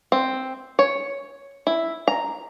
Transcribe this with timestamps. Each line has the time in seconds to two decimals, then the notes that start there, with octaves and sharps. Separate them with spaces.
0.12 C4
0.79 C#5
1.67 E4
2.08 A#5